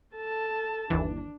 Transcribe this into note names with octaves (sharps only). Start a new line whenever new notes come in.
A4 A5
G1 D#2 E3 D4